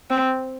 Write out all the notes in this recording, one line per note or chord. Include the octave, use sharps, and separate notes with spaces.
C4